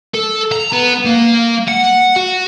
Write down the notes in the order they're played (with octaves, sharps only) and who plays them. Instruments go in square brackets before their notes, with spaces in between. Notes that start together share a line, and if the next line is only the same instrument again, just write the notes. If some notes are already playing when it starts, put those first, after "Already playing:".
[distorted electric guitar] A4
A#5
B3
A#3
F#5
F#4